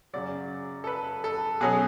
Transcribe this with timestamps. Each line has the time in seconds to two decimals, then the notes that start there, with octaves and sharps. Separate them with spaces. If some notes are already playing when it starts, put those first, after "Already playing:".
0.13 F#2 C#3 F#3 D5
0.84 A4
0.87 B4
1.24 A4
1.60 B2 F#3 C#4 G#4